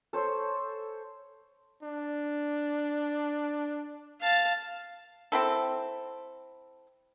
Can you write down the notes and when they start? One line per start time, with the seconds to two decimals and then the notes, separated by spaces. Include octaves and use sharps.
0.13 A4 C5 C#5
1.83 D4
4.21 F5 A5
5.32 C4 E4 A4